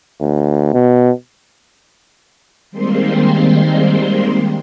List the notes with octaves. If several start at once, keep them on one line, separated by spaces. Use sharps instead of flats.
D2
B2
D#3 G3 G#3 A#3 C4 C6